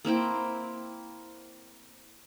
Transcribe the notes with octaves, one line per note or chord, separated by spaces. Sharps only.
A#3 C4 E4 G5